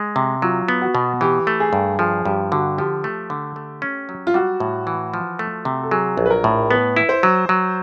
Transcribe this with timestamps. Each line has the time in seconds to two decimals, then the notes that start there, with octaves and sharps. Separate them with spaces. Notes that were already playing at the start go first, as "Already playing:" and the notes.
Already playing: G#3
0.16 C3
0.42 F#3 F4
0.68 B3
0.82 F#4
0.95 B2
1.21 E3 G4
1.47 A3
1.60 G#4
1.73 G2
1.99 F3 G#4
2.25 G2 G4
2.52 D3 F#4
2.78 F3 G4
3.04 A3
3.30 D3
3.56 A3
3.82 C#4
4.09 F#3
4.27 F4
4.34 G3 F#4
4.60 A2
4.87 E3
5.14 F3
5.39 A3
5.65 C3
5.83 A4
5.91 F#3 G#4
6.17 A#1
6.26 B4
6.30 A#4
6.44 A2
6.70 B3 B4
6.96 E4
7.09 C5
7.23 F#3
7.49 F#3